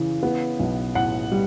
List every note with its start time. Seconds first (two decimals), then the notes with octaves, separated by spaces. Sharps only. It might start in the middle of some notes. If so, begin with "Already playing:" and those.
Already playing: C#3 E3
0.23 B3
0.59 B1
0.95 A2 F#5
1.32 G3